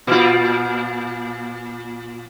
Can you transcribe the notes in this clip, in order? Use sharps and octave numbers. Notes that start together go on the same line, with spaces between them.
A#2 F4